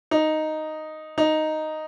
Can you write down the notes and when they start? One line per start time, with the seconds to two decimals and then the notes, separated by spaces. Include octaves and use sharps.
0.11 D#4
1.18 D#4